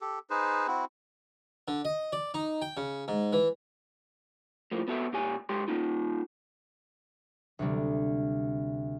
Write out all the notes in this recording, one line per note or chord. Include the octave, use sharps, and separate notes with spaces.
G4 A4
D#4 G#4 B4 C5
C4 E4 F#4
D3
D#5
D5
D#4
G5
C#3
G#2
E3
A2 F3 A#3
B3 F#4 A4 E5
A#2 G4 G#5
G#2 G4 C6
A#3 D#4 F4
D2 C3 G3